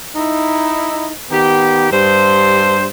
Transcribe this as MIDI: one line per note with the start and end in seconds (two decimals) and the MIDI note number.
0.16 1.10 63
0.16 1.10 64
1.31 1.87 51
1.31 1.87 59
1.31 1.87 67
1.91 2.87 43
1.91 2.87 72